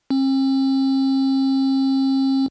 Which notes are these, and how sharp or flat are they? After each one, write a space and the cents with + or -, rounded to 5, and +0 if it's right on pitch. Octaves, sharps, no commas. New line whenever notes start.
C4 +45